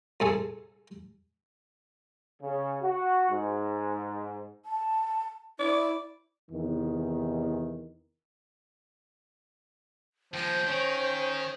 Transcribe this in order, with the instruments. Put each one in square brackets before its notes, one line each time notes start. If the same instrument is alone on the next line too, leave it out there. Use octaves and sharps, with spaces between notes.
[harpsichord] C2 G#4 A4
[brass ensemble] C#3
F#4
G#2
[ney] A5
[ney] E4 [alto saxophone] D5
[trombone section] E2 C3 D#3
[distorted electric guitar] D#2 G#3 [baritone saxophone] F3 [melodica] G5
[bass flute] C5
[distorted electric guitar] D#3 [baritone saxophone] C#4